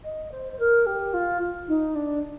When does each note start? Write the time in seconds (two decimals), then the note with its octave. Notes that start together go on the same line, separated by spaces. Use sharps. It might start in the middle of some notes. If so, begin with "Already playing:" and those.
0.04 D#5
0.31 C5
0.52 C5
0.59 A#4
0.86 G4
1.13 F4
1.68 D#4
1.95 D4